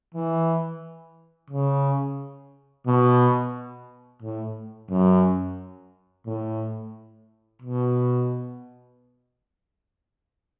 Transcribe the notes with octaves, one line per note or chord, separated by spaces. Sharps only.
E3
C#3
B2
A2
F#2
A2
B2